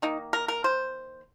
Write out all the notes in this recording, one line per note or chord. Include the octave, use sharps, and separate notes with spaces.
D#3 A#3 D#4
A#4
A#4
C5